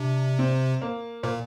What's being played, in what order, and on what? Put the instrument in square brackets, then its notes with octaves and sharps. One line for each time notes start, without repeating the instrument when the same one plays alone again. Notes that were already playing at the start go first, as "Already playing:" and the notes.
Already playing: [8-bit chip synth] C3 [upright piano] D4
[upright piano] C4
A#3
[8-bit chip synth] A#2 [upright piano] A#3